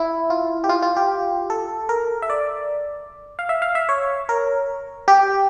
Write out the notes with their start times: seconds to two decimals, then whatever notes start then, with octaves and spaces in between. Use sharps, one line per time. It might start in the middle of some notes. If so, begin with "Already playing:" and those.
Already playing: E4
0.30 F4
0.64 G4
0.69 F4
0.82 F4
0.96 G4
1.50 A4
1.89 A#4
2.22 E5
2.30 D5
3.39 F5
3.49 E5
3.62 F5
3.75 E5
3.89 C#5
4.29 A#4
5.08 G4